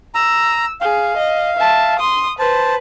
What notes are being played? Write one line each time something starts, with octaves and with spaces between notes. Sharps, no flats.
A#5 E6
G#4 F5
D#5
E5 A5
C6 D#6
B4 C5 A5